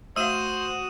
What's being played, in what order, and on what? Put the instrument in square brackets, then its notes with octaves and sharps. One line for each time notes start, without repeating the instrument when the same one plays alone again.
[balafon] A3 F5 [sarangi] F#4 [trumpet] C5 [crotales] D#6 D#7 E7